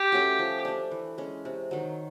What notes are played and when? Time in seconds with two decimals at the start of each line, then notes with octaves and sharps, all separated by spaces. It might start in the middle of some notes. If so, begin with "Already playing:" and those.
Already playing: G4
0.12 A3 C#4 F#4
0.39 F3
0.65 A3 D4
0.91 E3
1.18 G#3 C#4
1.45 C3
1.71 D#3 F#3